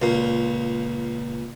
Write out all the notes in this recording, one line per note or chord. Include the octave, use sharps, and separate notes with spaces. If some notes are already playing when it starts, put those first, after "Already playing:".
C#2 A#2 A#3